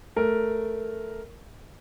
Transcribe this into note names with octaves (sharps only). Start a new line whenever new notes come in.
A3 A#4